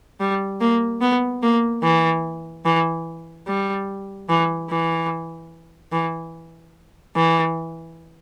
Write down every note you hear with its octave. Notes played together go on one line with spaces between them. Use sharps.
G3
A#3
B3
A#3
E3
E3
G3
E3
E3
E3
E3